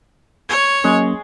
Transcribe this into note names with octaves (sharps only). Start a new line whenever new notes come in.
C#5 C#6 G#6
F#3 G#3 A#3 C#4